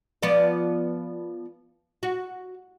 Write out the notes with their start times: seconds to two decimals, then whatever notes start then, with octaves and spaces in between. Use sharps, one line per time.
0.23 F3 B3 D5
2.03 F#4